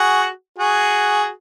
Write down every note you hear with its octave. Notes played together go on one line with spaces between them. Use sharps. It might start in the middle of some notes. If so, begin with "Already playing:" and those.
Already playing: F#4 G#4
F#4 G#4